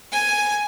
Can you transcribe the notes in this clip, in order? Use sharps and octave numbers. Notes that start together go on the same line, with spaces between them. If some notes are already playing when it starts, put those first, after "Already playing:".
G#5